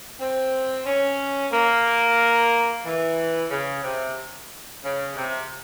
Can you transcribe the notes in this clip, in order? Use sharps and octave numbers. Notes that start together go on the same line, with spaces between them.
C4
C#4
A#3
E3
C#3
C3
C#3
C3